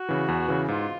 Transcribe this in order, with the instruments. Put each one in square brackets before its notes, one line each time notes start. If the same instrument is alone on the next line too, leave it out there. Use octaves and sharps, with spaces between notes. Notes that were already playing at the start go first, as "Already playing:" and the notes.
Already playing: [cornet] F#4
[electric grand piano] C#3 E3
E2
C#3 E3
[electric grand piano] G#2 [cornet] F4